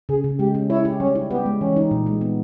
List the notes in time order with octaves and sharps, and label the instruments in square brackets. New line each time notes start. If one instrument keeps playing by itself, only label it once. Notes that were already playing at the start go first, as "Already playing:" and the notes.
[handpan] C#3 [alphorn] G#4
[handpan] C#3
[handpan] G#3 [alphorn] G4
[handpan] C#4
[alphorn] E4 [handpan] C#5
[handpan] G4
[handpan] G3 [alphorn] C#4
[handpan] E4
[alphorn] B3 [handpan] G4
[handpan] G#3
[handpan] E3 [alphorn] C#4
[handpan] D#4
A#2
G#3
B3